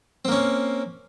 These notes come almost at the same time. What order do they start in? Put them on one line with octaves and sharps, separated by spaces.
C4 A#3 C#4